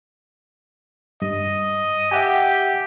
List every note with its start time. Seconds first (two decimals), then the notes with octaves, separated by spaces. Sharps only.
1.22 G2 D#5
2.11 G4 E5 F#5 G#5